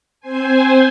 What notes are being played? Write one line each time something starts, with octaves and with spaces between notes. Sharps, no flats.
C4 C5 G#5